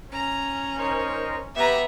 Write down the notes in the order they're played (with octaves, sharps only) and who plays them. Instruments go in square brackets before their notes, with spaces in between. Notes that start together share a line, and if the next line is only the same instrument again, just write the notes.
[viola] C#4 [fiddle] A#5
[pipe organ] D#4 A#4 C5 [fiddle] C#5
[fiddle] B3 B4 [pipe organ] G4 [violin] E5 A#5